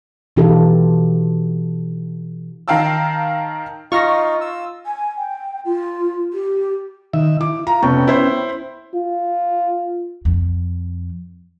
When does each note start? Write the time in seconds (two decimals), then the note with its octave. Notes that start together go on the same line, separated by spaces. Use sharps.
0.37 B2 E3 D#4 F4 G4 A4
2.68 D#3 A#4 F5 G5 A5 E6
3.92 D#4 F4 C#6 F6 A#6
4.41 E6
4.86 G#5
5.17 G5
5.65 F4
6.33 G4
7.13 D#3 E5
7.41 E4 D6
7.67 F4 A#5
7.83 F1 B3 C#4 G5 C#6
8.08 E4 C5
8.94 F4
10.25 F2